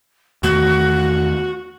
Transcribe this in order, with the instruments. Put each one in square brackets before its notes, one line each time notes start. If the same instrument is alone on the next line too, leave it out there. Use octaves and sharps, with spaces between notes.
[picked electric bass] E2 D#3 A3 [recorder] F#4